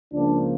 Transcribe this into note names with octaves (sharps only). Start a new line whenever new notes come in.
C#2 C#3 F3 A#3 D4